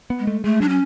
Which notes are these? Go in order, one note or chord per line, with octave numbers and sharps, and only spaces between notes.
B3
G#3
A3
G#3 A3
F#3 D4
C#4